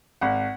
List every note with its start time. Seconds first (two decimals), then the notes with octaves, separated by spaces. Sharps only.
0.21 G#1 F#5